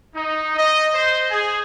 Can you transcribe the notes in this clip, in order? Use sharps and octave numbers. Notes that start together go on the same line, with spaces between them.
D#4
D#5
C5
G#4